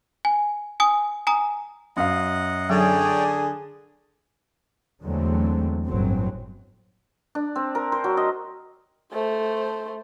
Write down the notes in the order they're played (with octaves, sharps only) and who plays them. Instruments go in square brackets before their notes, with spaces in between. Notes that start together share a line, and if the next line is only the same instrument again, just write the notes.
[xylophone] G#5
G#5 D#6
G#5 A#5 D#6
[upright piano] F#2 F5 [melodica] D#5 F#5
[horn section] D3 G#4 [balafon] F#3 [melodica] C#5 D5 G5
[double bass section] E2 D3 F#3 G#3 A3 C4
G1 A2 F#3 C4
[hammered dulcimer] D4
C4
A#4
C5
F#3
D#5
[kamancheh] A3 C5